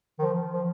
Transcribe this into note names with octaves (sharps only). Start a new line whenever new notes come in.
D#3
F3
F3